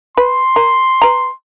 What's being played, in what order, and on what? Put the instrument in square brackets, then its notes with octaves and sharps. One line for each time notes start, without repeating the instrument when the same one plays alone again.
[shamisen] B4 [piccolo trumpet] C6
[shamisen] A#4
B4 A#5